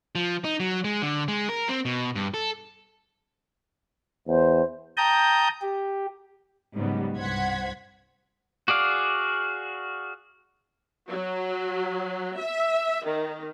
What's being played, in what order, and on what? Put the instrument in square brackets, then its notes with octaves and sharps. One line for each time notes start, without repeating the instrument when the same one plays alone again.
[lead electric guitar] F3
D#4
F#3
G#3
D3
G#3
A#4
C4
B2
G2
A4
[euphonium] E2 [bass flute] C5
[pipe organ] G5 A5 A#5 D#6 G6
G4
[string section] G#2 C#3 F#3 G3 B3
C2 G2 C5 F#5 G#6 B6
[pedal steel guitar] F#4 G#4 D5 F5
[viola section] F#3
E5
D#3